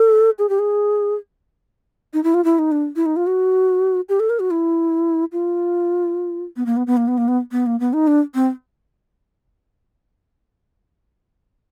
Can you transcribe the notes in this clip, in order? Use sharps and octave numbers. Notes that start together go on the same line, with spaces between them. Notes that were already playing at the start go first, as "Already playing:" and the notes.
Already playing: A4
G#4
G4
G#4
D#4
E4
F4
E4
D#4
D4
E4
D#4
F4
F#4
G4
A4
A#4
F#4
E4
F4
B3
A#3
B3
B3
A#3
B3
A#3
B3
B3
A#3
B3
D#4
D4
C4